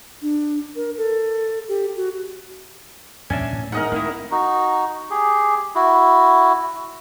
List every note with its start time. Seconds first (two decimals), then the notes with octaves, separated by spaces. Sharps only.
0.22 D4
0.76 A#4
0.98 A4
1.69 G4
1.97 F#4
3.30 E2 A#2 G3 C#4 D4 E5 G#5
3.53 A2
3.72 E2 G#2 A#4 D#5 F#5
3.92 D#3 A3 A#3 C4 E4
4.31 D#4 F#4
5.10 G4 G#4
5.75 E4 F#4